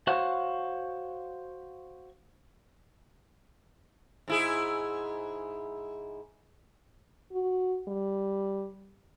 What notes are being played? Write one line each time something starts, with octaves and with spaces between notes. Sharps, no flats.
F#4 C5 C#5 F5 F#5
G#2 E4 G#4
F#4
G3